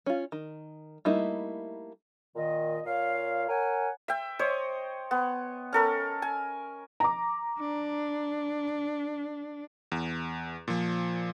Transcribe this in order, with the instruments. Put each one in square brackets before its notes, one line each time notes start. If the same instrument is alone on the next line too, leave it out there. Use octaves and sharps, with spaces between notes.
[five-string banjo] C#4 F4
D#3
G3 A3 A#3 D#4 E4
[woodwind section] A#2 D#3 D#5
A#2 C#5 F5
A#4 C#5 F#5 G#5
[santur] E5 G5
C5 C#5 D#5
B3
C#4 A4 A#4
G#5
[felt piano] A#5 D6
[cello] D4
[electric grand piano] E2
A#2 F3